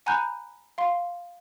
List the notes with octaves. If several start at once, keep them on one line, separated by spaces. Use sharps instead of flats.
F#5 G#5 A#5 B5 F#6 G6
F5 C6